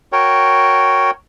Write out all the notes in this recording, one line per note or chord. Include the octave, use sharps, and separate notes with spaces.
F#4 A#4 C#5 G5